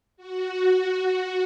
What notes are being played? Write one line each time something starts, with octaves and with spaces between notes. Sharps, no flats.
F#4